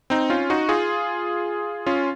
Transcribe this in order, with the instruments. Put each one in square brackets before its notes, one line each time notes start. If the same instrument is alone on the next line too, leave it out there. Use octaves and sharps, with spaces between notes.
[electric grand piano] C4 D#4
C#4 F4
D#4 F#4
F4 G#4
C#4 F4